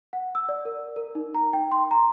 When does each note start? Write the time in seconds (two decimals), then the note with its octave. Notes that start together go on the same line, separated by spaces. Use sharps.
0.13 F#5
0.35 E6
0.49 D5
0.65 A#4
0.96 A#4
1.15 D#4
1.34 A#5
1.53 G5
1.72 C6
1.91 A#5